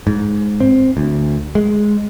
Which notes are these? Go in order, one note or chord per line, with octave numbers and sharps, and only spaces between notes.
G#2
C4
D2
G#3